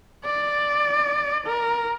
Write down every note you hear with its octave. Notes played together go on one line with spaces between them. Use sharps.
D5
A#4